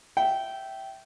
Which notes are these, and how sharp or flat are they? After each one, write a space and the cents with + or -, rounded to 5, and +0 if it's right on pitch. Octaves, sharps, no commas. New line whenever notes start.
E5 +0 G5 -15